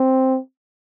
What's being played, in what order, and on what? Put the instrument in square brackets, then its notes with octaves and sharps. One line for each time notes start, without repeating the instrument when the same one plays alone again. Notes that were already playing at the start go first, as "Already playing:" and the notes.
Already playing: [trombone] C4